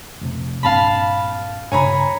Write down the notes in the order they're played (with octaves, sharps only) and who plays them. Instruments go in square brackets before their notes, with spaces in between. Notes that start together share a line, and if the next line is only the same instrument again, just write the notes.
[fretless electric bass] F1 C3
[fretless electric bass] A#1 G2 C4 [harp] F5 A5 B5
[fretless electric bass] G2 C#3 [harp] C#5 [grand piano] G#5 A#5 B5